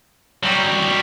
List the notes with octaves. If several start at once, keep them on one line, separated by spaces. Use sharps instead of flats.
F#3 G3